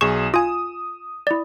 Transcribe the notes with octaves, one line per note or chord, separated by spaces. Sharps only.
B1 G#4 C#6 E7
F4 G#5 D#6
E4 D5